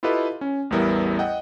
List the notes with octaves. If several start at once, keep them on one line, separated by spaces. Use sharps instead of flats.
E4 F4 G4 A4 B4 D#5
C#4
A1 E2 G3 B3 E4 A#4
D#5 F#5 G5